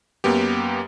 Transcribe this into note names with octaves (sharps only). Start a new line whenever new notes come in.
F#2 A#3 B3 G4